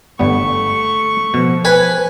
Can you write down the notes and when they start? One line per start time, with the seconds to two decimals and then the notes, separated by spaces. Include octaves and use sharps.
0.19 G1 G3 A3 B3 C#6
1.34 B2 F3
1.65 B4 G#5